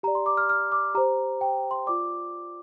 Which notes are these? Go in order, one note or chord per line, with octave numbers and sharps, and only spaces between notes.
G4 D5 A#5
C6
D6
F6
F6
D6
G4 C5 A#5
G5
C6
F4 D5 D6